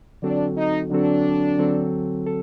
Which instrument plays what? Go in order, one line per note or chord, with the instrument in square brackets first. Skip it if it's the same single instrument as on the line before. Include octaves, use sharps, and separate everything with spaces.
[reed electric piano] D3 F#3 C4 F#4 A4 [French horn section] D4
[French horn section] D#4
[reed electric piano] D3 F#3 C4 F#4 A4 [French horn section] D4
[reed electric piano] D3 F#3 C4 F#4 A4
A4